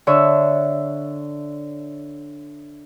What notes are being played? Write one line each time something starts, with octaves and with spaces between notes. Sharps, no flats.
D3 C#5 E5 C#6 E6